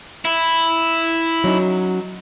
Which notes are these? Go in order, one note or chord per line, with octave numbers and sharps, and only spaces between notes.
E4
F#3 C#4 D#4